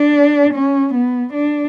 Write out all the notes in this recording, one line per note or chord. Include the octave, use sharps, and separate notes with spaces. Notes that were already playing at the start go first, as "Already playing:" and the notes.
Already playing: D4
C#4
B3
D4